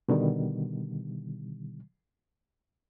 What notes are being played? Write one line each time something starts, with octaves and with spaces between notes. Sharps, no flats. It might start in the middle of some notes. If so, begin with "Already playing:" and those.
B2 D3 D#3 G3